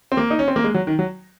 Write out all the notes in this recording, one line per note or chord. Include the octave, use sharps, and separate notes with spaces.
C4
A#3
D#4
C#4
C4
A#3
G#3
F#3
D#3
F#3